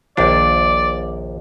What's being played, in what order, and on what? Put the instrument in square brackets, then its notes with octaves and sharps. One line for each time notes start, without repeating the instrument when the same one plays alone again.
[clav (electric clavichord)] A#1 D#2 D4 [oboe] D5